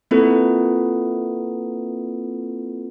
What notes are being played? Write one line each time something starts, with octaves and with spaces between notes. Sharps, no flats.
A#3 C4 E4 F4 A4 B4